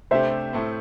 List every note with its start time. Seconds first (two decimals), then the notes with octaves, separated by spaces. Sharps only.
0.11 C3 A3 D4 G4 C5 E5
0.53 A2 A3 C4